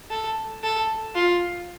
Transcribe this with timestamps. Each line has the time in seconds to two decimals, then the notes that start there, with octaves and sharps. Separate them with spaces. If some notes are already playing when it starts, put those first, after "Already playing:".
0.10 A4
0.63 A4
1.15 F4